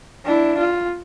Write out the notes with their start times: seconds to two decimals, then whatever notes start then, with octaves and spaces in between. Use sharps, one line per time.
0.25 D4 E4
0.58 F4